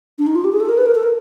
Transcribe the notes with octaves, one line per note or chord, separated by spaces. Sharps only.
D4
D#4
F4
G4
G#4
A4
A#4
B4
A#4
A4
A#4